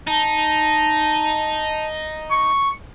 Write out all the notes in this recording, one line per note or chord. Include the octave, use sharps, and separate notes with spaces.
D#4 A5
C#6